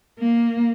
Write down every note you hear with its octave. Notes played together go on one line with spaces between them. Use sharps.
A#3